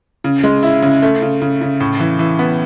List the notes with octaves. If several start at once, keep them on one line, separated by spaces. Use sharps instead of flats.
C#3
G#3
E4
C#3
A3
C#3
C#3
C#3
A2
E3
E3
B3